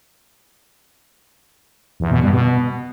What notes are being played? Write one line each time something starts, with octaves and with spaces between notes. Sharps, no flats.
E2
B2
G2
B2